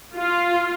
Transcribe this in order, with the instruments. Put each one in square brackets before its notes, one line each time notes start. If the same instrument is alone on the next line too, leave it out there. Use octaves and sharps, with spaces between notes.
[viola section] F4